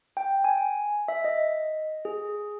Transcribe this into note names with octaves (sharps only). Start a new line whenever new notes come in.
G5
G#5
E5
D#5
G#4